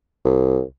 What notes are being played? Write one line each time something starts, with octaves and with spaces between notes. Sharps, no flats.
C2